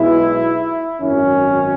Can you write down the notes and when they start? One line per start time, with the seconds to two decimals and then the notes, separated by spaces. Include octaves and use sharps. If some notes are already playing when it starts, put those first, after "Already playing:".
Already playing: B1 B2 G#3 E4
1.00 G#1 F#2 D#3 C#4